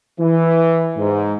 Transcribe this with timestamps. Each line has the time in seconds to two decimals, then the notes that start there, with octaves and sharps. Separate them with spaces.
0.19 E3
0.96 G#2